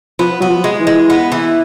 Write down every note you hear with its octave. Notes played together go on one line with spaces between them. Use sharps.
F3 B3
F#3 B3
F3
G#3
E3
G#3
B3
E3